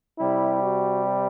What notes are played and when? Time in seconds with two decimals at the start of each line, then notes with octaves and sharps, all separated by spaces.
0.19 C3 G3 E4
0.63 F#4